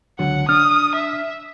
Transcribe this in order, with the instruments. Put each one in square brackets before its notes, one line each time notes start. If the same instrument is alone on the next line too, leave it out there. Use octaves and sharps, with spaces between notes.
[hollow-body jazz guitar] C#2 D3 F#3 [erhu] F#5
[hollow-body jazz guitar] D4 [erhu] D#6 [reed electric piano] F6
[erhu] E5